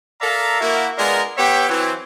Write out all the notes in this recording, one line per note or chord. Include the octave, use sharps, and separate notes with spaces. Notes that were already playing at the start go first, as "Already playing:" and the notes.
A4 A#4 D5 E5 F5 A#5
A#3 E4 F#4
G#3 B3 D4 F4 A#4
B3 G4 C#5 E5 G5
E3 F#3 C4